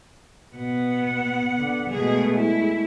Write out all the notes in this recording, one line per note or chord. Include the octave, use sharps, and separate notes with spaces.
B2 B3 F#5
D3
B2 G#3 A3 G#4
E4